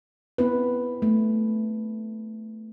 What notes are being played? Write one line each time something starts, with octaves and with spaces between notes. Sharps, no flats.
B3 C4 E4 B4
A3